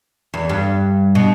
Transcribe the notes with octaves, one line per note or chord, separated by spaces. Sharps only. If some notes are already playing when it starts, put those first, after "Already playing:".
E2
G2
B2